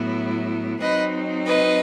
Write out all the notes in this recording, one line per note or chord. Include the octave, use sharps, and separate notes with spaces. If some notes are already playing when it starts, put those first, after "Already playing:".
Already playing: A2 F#3 B3 E4
F#3 C4 D#4 B4 D#5
B4 D#5